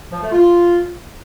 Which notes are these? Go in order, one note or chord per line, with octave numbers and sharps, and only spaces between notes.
F3
A3
F4